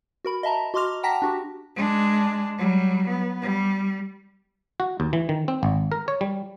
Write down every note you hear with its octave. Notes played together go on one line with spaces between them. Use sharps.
F#4 A#4 B5
D#5 E5 A5 A#5
F#4 D#5 C6 D6 F6 F7
F#5 G5 A5 A#5 A#6 B6
D4 F#4 G4
G#3 D4
F#3 G3
B3
G3
F#4
D#2
E3
D#3
C4
G#1
A#4
C#5
G3